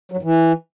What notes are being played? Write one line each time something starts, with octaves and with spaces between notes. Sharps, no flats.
F#3
G2
E3